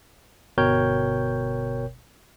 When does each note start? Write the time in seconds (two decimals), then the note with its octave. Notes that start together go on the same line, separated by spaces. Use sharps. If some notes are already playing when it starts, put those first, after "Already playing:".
0.58 G1 B2 A#4 C#5 G5 G6